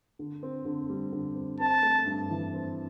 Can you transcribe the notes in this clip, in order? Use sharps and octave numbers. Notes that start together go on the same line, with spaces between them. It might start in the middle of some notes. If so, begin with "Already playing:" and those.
D3
C4
D3
G3
D3
C4
C4 A5
A3
G2
E3
C4